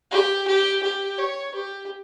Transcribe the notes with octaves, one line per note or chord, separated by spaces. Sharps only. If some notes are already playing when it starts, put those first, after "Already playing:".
G4
G4
G4
C#5
G4